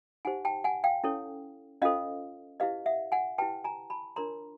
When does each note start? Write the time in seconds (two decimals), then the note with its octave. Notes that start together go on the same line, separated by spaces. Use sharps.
0.25 D#4 G4 C5 F#5 G#5
0.45 G5 A5
0.64 F#5 G#5
0.84 F5 G5
1.04 C#4 E4 A4 C#5
1.82 C#4 F4 A4 C5 D#5 F5
2.60 E4 G4 B4 D#5 F5
2.86 E5 F#5
3.12 F#5 G#5
3.38 E4 G4 B4 G5 A5
3.64 G#5 A#5
3.90 A5 B5
4.16 D4 F4 A#4 C#5 A#5 C6